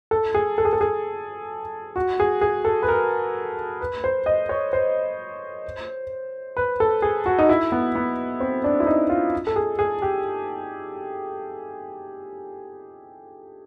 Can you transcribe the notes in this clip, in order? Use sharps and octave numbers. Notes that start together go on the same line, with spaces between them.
A4
G#4
A4
G#4
A4
G#4
F#4
G#4
G#4
A4
B4
A#4
B4
C5
D#5
C#5
C5
B4
A4
G#4
F#4
D#4
E4
B3
B3
C4
D4
E4
D#4
F4
A4
G#4
G#4
G4